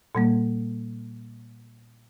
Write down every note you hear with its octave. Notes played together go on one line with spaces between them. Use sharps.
A#2 G3 A#3